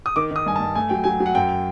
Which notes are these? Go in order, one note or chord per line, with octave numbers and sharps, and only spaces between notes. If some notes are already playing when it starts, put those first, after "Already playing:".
D#6
D#3 D6
D#3 D#6
G2 G#5
A5
G2
A3 G#5
F#3 G5
F#3 G#5
F#3
F#5
F#2 G5